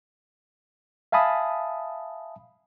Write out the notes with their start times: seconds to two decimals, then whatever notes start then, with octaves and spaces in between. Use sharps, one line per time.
1.12 E5 F5 G#5 A5 B5 D#6